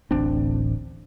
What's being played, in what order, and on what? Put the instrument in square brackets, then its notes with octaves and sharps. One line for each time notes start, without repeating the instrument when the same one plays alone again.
[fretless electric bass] D1 A1 C4 D4